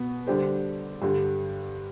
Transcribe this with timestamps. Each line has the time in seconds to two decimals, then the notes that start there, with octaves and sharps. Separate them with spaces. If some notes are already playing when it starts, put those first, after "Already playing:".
Already playing: B2 B3
0.27 D3 G3 D4 G4 C5
1.02 G2 D3 G3